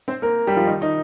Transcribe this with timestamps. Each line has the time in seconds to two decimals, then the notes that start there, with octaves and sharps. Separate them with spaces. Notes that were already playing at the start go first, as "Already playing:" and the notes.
0.08 C4 C5
0.22 A#3 A#4
0.47 G3 G4
0.57 F3 F4
0.67 D#3 D#4
0.81 D#3 D#4